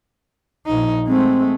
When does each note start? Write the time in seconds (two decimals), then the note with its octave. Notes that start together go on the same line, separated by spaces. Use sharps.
0.66 A#1 D#4
1.07 G#3 A3 C4